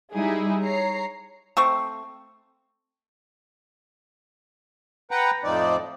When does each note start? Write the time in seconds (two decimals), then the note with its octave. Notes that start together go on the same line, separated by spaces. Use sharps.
0.15 G3 G#3 D#4 E4 G#4
0.62 C#5 A#5 C7
1.57 A3 C4 C#6
5.11 B4 F#5 G5 A#5
5.44 F2 A2 F3 C4 D#4 D5